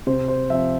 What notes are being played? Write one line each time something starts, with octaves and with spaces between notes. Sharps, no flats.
C3 C5
C5
F3 C4 E5